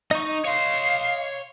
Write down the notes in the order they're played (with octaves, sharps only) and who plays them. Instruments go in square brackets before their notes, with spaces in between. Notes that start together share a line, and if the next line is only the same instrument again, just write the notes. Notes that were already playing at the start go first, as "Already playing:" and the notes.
[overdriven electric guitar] D#4 [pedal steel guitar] D#5 C#6
[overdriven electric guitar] C#5 C6 [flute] F5